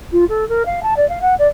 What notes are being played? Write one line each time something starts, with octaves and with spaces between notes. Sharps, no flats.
F4
A4
A#4
F5
A5
D5
F5
F#5
D5